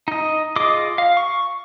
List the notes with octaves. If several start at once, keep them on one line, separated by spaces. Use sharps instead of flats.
D#4 D#5
F4 G#4 D#5 D6 D#6
F5
C#6